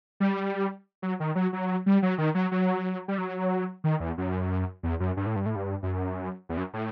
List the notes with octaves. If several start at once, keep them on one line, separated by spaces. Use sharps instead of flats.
G3
F#3
D#3
F#3
F#3
G3
F#3
D#3
F#3
F#3
G3
F#3
D#3
E2
F#2
E2
F#2
G2
A2
G2
A2
G2
F#2
E2
F#2
A2